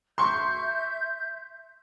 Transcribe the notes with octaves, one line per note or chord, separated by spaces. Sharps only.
E5 C6 C#6 G6